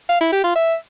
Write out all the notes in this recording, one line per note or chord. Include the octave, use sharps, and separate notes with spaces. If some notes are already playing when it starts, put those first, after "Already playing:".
F5
E4
G4
F4
E5